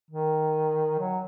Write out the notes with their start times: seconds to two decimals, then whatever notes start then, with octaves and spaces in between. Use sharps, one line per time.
0.11 D#3
0.99 F#3